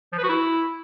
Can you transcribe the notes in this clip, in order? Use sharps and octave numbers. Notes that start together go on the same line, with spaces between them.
F3
B4
F#4
E4